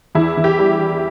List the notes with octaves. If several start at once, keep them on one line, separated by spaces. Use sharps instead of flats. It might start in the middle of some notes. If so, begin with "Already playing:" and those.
E2 E4
E2
G4
G3